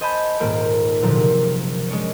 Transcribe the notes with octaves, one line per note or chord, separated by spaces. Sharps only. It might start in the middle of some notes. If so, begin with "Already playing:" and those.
C5 D#5 G#5 A5 B5 G6
D#1 G#2 A#3 C5 D7
F#1 A#2 D3 F3
C3
G#3 C#4 D4 C#5